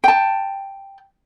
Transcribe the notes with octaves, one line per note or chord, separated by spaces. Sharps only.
G5 A5